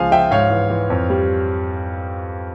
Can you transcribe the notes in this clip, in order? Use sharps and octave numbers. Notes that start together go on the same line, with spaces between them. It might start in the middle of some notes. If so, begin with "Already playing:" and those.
Already playing: C#2 F3 G#3 F5 G#5
F3 E5 G5
G#2 C#5 F5
E3
E3
F2
G3